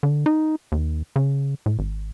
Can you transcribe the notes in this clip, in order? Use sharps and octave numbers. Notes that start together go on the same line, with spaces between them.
D3
D#4
D#2
C#3
A2
G#1